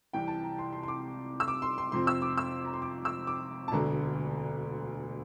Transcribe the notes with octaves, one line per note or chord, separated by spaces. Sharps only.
C2 C3 E3 G5
A5
A#5
C6
C6
C6
D6
E6
D6
C6
C6
F2 C3 F3 C4 C6
E6
D6
E6
A#5
C6
D6
E6
D6
A5
E1 D2 D3 A3 A#5